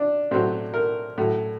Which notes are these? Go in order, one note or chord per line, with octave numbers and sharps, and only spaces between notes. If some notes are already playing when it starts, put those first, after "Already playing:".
Already playing: D4
A2 F#3 C4
A#4
A2 F#3